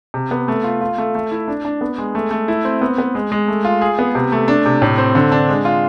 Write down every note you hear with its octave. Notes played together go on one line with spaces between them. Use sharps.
C3
B3
A3
F4
F4
A3
A3
E4
D4
D4
B3
G#3
A3
A3
E4
C4
B3
B3
G#3
G#3
A3
F4
G#4
B3
C3
A3
D4
C3
A2
C4
D3
D4
G#3
F4